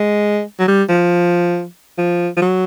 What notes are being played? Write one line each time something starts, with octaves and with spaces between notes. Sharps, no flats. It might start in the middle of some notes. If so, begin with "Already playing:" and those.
Already playing: G#3
F#3
G3
F3
F3
F3
F#3